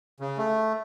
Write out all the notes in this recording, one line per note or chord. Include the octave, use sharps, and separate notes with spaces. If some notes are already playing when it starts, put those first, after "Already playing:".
C#3
A3